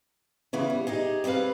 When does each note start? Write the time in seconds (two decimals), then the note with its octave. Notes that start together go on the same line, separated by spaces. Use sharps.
0.53 C#3 E3 B3 F4
0.70 G3
0.87 D#4 G4 G#4
1.24 G3 C4 G#4 B4 F5